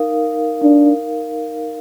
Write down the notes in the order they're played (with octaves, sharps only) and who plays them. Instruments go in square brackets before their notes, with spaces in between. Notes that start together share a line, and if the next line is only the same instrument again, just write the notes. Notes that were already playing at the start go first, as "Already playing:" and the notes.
Already playing: [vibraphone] D#4 A#4 F5
[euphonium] D4